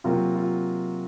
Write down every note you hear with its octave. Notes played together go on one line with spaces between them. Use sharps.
C3 F#3 A#3 F4
F4